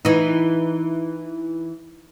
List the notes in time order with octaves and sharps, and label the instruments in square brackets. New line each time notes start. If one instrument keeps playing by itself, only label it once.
[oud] E3 D#4